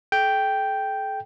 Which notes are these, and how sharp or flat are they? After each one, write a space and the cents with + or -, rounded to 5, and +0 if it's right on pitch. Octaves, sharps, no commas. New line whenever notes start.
A4 -40 G5 +0